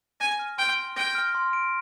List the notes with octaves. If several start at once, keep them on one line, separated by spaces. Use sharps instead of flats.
G#5 A#6
F6
G5 C6
D7
G5 A#6
F6
C6
D7